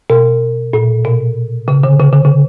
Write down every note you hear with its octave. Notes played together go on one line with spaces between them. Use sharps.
B2
A#2
B2
C#3
D3
C#3
D3
C#3